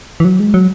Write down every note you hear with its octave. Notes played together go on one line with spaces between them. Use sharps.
E3
F#3
G#3
F#3